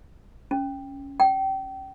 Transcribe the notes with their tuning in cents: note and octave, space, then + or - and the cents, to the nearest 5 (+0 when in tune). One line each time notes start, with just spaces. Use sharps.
C#4 +5
G5 -30